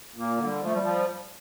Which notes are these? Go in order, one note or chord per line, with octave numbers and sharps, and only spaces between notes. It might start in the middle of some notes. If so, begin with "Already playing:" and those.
A#2 A#3
D3
G3
F3
A3
G3
F3